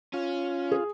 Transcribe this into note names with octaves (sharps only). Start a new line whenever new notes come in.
C#4 F4
G#4